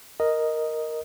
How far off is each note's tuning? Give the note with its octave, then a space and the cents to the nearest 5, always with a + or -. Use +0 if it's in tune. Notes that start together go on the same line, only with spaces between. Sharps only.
A#4 +0 D#5 +0